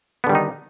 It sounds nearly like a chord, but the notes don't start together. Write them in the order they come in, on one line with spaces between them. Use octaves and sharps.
B3 D3 G3 D#3 D#4